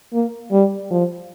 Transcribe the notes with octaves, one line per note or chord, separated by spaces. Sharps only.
A#3
G3
F3